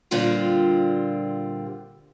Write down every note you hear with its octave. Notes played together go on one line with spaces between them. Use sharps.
A#2 D3 G3 C4 F4